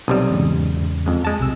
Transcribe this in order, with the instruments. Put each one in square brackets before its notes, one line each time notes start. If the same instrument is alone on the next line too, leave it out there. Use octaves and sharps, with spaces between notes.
[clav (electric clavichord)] B1 C3 G3 [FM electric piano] D#6
[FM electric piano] E2 G#2 C#3
[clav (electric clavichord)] F2 G#3
G#3 A5
[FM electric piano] B1 C3 E6